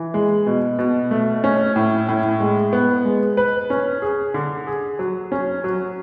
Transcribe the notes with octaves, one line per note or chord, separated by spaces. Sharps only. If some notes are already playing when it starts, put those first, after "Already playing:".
Already playing: E3
G#3
B2
B2
A3
C#4
A2
A2
G#3
B3
G#3
B4
C#4
G#4
D3
G#4
F#3
C#4
F#3